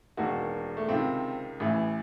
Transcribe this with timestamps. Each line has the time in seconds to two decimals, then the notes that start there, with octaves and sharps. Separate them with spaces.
0.17 E1 D#2 D#3 F#4
0.77 A3
0.89 C#2 C3 D#3 C4
1.60 A1 A2 E3